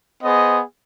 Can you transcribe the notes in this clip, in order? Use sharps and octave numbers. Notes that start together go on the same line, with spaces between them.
B3 G#4 C5 D#5